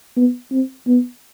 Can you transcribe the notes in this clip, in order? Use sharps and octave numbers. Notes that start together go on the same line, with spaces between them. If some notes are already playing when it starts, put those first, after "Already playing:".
B3
C4
B3